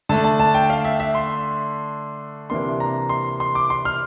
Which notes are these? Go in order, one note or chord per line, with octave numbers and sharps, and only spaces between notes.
D3 A3 D4 A5
A5
A5
G5
F5
E5
E5
C6
C3 E3 A#3 D4 C6
A#5
C6
C6
D6
C6
F6